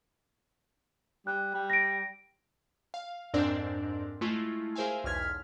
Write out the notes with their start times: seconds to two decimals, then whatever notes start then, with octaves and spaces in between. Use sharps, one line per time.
1.27 G3 F#6
1.54 G3
1.70 A#6 D7
2.94 F5
3.34 F2 G#2 C4 D4 A#4 D5
4.21 G#3 A3 E4 F4
4.75 G#4 A#4 C5 E5 F5 G#5
5.04 B1 E2 F6 G#6 B6